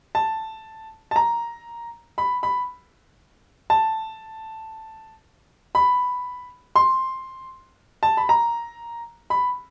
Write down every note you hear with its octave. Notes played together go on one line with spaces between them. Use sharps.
A5
A5
A#5
B5
B5
A5
B5
C6
A5
B5
A#5
B5